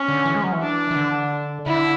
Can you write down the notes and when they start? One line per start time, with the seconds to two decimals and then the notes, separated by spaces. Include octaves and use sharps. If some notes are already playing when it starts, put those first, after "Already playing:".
Already playing: C#4
0.08 D3
0.26 E3
0.35 G#3
0.43 F#3
0.52 E3
0.61 D4
0.91 E3
0.96 D3
1.66 D3 E4